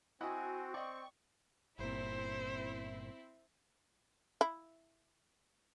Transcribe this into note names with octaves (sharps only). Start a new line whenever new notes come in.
C4 E4 F#4 D#5 G#5 B5
D5 D#5 G5 C#6
G1 A#2 C4 E4 C5
E4